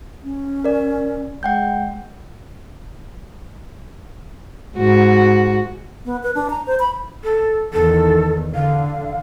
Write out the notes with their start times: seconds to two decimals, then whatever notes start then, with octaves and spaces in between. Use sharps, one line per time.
0.23 C#4
0.64 A#4 D5
1.43 G#3 F#5 G5 G6
4.78 G#2 F#4
6.05 B3
6.23 B4
6.35 D4
6.50 A#5
6.67 C5
6.79 B5
7.24 A4
7.73 E2 D#3 A4
8.54 D3 F5